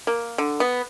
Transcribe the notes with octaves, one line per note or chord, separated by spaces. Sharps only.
A#3
D3
B3